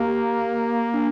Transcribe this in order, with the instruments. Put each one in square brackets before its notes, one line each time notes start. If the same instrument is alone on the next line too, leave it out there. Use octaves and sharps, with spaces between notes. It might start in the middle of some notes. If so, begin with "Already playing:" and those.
Already playing: [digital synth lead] A#3 [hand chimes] G4
[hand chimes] D4